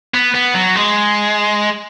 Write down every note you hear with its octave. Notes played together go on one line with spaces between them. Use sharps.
B3
B3
F#3
G#3